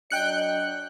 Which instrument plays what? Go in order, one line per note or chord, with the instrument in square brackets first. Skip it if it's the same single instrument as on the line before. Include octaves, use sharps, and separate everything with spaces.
[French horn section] F#3 D4 D#5 [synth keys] G5 F#6 C#7